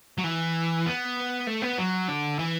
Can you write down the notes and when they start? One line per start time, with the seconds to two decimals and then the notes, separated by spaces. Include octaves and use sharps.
0.18 F#3
0.24 E3
0.86 B3
1.47 A3
1.62 B3
1.78 F#3
2.08 D3
2.39 E3